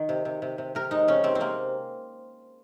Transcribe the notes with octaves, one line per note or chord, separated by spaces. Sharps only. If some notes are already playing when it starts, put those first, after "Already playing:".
Already playing: D#3
C3
C3
C3
C3
C3 A#4
G#3 D#4
C3 C#4
C3 C4
C4
C3 A#3